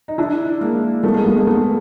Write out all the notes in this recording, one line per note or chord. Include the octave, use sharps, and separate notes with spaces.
D#4
D4 E4
G#3 A#3
A3 B3
G#3 A#3
A3 B3
G#3 A#3
A3 B3